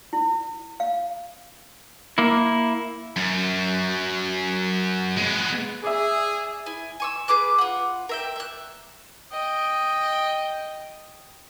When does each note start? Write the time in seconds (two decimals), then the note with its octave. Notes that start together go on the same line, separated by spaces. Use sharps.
0.13 E4
0.80 F5
2.18 A#3 E4
3.16 F#2
5.17 G#3 B3
5.84 G#4 D5 E5
6.66 E4 G#5
7.00 G#5 C#6 E6
7.28 G#4 B4 D6 F#6
7.58 F4 F#5
8.09 A#4 E5 G5
8.36 E5 F#6
9.32 D#5 G5